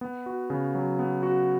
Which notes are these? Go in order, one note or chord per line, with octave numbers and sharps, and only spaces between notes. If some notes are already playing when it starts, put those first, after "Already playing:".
B3
F#4
C#3
F#3
B3
F#4